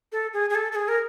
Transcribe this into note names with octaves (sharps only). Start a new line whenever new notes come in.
A4
G#4
G#4
A4
A4
G#4
A#4